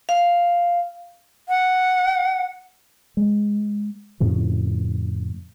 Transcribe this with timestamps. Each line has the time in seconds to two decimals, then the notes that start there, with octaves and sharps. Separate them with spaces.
0.09 F5
1.49 F#5
3.17 G#3
4.20 F2 A2 C#3 F3